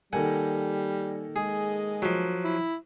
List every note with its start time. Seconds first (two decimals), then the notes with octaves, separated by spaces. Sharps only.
0.13 D#3 G3 A#3 A4 F#5 G#5
1.36 G#3 G#4
2.02 F3 F#3
2.44 E4